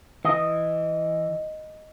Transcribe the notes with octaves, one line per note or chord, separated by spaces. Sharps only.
E3 D#5